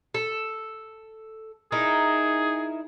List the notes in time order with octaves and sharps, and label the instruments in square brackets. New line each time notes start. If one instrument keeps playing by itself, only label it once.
[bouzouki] A4
[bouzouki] D#4 E4 A#4 [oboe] G#4